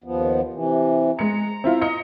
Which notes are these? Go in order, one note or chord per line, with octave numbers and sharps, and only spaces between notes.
D#2 F3 B3
C3 E3
G#3 A#5 C#7
C4 E4 F4
D#5 A#5 C#7